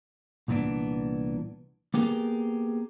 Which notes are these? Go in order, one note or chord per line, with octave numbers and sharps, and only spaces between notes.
C2 A#2 E3 B3 D4
A#3 B3 G4 G#4 A#4